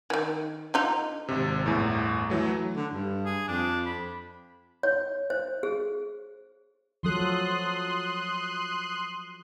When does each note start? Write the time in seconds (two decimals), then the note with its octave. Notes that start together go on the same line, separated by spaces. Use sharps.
0.10 D#3 E3
0.74 D3 D#4 F4
1.28 G#1 C3
1.66 G1 E2 A2
2.30 E3 F#3 A3
2.76 D3
2.93 G2
3.25 G#4
3.48 F2 D4
3.86 B5
4.83 C#5
5.30 C5
5.63 G#4
7.03 F3 F#3 A4 C6 D#6 F#6